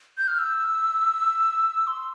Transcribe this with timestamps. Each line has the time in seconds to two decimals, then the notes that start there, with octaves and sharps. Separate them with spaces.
0.18 G6
0.28 F6
0.39 E6
1.87 C6